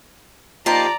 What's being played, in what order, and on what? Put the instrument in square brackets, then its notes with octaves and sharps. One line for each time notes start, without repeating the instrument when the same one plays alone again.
[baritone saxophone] F3 [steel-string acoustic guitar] A#3 D#4 G4 [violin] D5 A#5